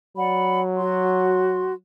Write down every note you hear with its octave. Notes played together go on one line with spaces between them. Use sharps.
F#3 D5 F#5 B5
F#4 C6